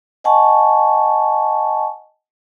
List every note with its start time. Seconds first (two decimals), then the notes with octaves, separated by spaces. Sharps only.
0.24 D#5 F#5 G#5 A5 C#6